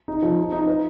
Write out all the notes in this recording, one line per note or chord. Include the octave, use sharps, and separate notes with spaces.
D#4
F3
D#4
D#4
B4